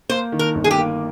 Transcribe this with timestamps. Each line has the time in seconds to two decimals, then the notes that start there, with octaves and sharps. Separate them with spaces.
0.09 A#3 C5
0.32 D#3
0.39 A#4
0.55 G1
0.64 G#4
0.71 G4
0.78 A#3